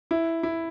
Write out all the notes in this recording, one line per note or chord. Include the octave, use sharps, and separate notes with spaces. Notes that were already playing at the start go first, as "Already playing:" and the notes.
E4
E4